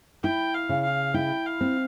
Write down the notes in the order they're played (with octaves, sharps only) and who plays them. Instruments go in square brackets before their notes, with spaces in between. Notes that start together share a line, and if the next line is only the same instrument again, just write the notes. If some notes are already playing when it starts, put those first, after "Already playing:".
[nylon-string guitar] E4 [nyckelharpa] G5
[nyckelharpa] F5
[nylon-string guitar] C#3
[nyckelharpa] F5
[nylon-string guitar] E4 [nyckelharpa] G5
[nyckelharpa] F5
[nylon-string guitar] C4